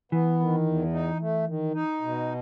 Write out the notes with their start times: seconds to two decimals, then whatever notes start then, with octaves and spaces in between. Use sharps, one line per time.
0.12 E3 B3
0.40 D#3
0.66 E2
0.93 D#4
1.20 A3
1.47 D#3
1.74 D#4
2.01 B2